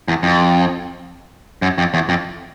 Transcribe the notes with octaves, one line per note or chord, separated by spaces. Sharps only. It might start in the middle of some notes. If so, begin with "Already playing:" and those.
E2
F2
F#2
F2
E2
F2